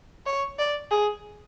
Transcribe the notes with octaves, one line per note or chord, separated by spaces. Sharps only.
C#5
D5
G#4